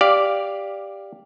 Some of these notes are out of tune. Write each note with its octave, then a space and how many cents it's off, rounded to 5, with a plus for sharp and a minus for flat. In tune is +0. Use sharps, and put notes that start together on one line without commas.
G4 +10 D5 -5 F5 +0